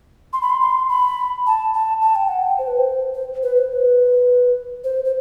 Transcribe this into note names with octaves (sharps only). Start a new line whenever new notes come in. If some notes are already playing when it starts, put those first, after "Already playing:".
C6
B5
C6
C6
B5
A5
A5
A5
G5
F#5
G5
C5
B4
C5
C5
B4
C5
B4
C5
C5